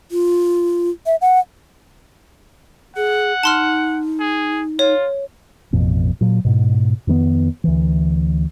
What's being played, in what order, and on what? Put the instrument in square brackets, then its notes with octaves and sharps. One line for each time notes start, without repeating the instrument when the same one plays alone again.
[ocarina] F4
E5
F#5
[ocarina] G#4 [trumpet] F#5
[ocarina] D#4 [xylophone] A5 C6 F6
[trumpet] G#4
[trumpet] F4 [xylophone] C#5
[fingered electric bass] A1 F2 B2
A#2 F#3
G#2 B2
F2 D#3 G#3 B3
D2 E3